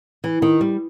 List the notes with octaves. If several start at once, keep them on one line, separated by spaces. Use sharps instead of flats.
E3
D#3
G3